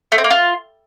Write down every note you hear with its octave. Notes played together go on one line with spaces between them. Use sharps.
A3
C4
A#3
F4